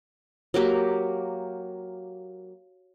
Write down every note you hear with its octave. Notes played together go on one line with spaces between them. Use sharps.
F#3 A#3 G4 A#4